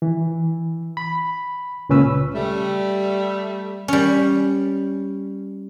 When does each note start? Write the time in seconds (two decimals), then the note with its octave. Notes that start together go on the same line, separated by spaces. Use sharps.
0.02 E3
0.97 B5
1.89 C#2 A#2 C#3 C#4 B4 E6
2.35 G3 A3
3.88 G3 C#4